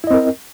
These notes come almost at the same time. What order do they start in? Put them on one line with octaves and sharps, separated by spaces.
E4 D#5 C4 A#4